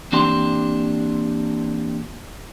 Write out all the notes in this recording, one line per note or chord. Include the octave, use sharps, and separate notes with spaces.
E3 A#3 C4 D4 G4 C6